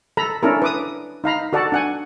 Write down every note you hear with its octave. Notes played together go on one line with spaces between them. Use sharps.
A4 A#5 B5
C#4 D4 E4 A4 A#4
B4 D6 D#6
D#4 F5 A#5 B5
F#4 A4 D5 F#5 A5
D4 F#5 G#5